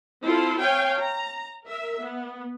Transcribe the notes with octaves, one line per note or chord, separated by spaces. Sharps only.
C4 E4 F4 A4 C6
C#5 F5 G5 G#5
A#5
A#4 E5
B3